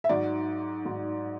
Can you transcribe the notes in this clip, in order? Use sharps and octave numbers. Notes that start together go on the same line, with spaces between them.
E5
G#2 F#3 D5
G#2 F#3